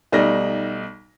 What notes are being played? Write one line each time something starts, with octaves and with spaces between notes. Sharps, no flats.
B1 G3 A3 D#4 A#6